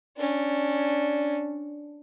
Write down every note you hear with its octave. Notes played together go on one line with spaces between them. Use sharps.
C#4 D4